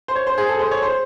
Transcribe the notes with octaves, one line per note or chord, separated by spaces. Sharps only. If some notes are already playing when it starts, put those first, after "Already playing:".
C5
C#5
C5
G#4
A4
C5
C#5
C5